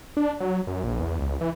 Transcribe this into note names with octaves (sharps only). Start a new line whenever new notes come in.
D4
F#3
F#2
A#1
E2
C#2
E3